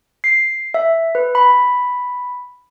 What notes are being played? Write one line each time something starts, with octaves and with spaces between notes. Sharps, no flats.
C7
E5
B4
B5